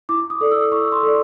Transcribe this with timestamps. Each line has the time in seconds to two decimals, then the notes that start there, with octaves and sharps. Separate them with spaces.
0.09 E4 D6
0.30 D#6
0.41 A4 D5
0.51 E6
0.72 E4 C#6
0.92 C6
1.03 A4 D5